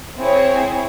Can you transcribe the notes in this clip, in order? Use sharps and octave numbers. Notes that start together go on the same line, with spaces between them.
C4 E4 G#4 C#5